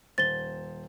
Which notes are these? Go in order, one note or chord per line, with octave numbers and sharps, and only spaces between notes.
D#1 C5 A6 G7